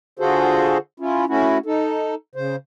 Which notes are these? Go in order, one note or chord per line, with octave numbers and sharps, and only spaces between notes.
D3 F4 F#4 G#4 A4 C5
C#4 E4 F4
A3 C#4 E4 F#4
D#4 A4
C#3 C5